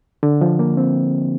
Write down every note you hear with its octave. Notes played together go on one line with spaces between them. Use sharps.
D3
F3
A#3
C4